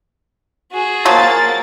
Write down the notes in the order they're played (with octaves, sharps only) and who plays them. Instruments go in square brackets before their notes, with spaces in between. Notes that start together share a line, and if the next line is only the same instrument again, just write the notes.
[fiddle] F#4 G#4
[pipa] F3 F#3 [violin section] A#3 A6